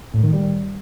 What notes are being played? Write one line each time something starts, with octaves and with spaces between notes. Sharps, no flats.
A2
D#3
G3